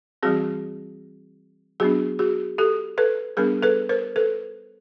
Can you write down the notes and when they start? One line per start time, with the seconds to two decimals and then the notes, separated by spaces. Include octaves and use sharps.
0.23 E3 G3 C4 F#4 G#4
1.80 F#3 B3 D4 F#4 G#4
2.19 F#4 G#4
2.58 G4 A4
2.98 A4 B4
3.37 G3 B3 D4 G#4 A#4
3.62 A4 B4
3.89 A#4 C5
4.16 A4 B4